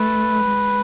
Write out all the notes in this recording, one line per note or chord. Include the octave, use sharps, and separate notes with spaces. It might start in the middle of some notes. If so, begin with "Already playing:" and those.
Already playing: A3 B4
G#3